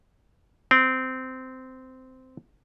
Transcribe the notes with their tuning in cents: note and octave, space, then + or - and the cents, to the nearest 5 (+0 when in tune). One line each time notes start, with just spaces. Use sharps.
C4 -15